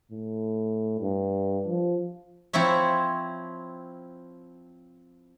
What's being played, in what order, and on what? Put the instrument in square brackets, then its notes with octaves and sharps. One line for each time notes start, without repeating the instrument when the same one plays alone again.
[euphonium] A2
G2
F3
[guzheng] F3 C4 E4 C#5 E5